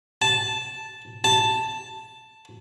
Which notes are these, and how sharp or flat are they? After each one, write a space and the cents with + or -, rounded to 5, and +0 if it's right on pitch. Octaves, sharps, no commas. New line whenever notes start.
A5 -5
A5 +5